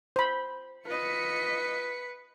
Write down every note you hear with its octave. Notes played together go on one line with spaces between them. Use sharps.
C5 B5
F4 B4 D#5 B6 C#7